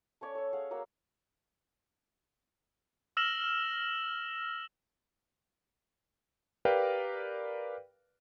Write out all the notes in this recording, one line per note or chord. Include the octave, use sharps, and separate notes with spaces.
A3 C#4 C#5 D5
A4 C#5
G#4 F5 F#5
F#3 A#3 F#5 E6
E6 F6 A#6 E7 F#7
G4 A#4 B4 D5 F5 G5